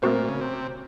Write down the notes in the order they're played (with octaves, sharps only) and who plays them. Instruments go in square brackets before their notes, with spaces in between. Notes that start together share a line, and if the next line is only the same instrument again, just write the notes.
[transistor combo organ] A#2 [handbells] A3 C4 F#4 C5
[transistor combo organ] C#3
C3